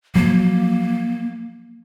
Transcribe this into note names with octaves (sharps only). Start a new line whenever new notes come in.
F3 F#3 A#3